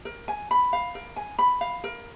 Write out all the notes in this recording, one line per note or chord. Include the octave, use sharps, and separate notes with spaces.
A#4
G#5
B5
F5
A#4
G#5
B5
F5
A#4